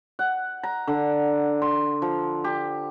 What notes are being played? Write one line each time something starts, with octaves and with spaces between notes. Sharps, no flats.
F#5
A#5
D3
C6
F3
G4